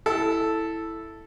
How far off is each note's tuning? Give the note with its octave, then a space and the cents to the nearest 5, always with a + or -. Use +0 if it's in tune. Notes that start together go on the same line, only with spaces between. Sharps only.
E4 +0 A4 +0